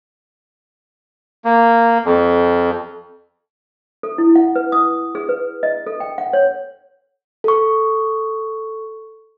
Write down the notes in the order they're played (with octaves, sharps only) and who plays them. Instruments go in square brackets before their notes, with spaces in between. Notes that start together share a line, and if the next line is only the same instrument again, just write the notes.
[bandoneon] A#3
F2
[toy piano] A4
E4
F#5
B4
D#6
G#4
B4
D#5
A4
G5
F#5
C#5
[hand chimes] A4 C#6